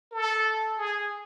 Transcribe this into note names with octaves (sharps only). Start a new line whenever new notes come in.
A4
G#4